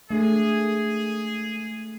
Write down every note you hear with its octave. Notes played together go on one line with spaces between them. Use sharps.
G#3 A3 D4 G#4